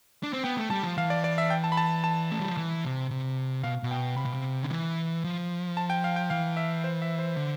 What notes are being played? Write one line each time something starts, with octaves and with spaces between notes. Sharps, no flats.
D4
C4
B3 G5
A3
G3 A5
F3
E3 F5
D5
D5
E5
G5
A5
B5
A5
A5
A3
G3
F3
E3
C3
C3
B2 F5
B2
G5
C3 B5
B2
C3
D3
E3
F3
A5
G5
F5
G5
E3 F5
E5
C5
E5
C5
D3